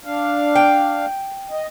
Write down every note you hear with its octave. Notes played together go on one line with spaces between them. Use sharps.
D4 F5
G5
D#5